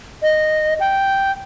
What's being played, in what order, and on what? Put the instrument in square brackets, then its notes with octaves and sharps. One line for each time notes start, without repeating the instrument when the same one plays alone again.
[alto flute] D#5
G5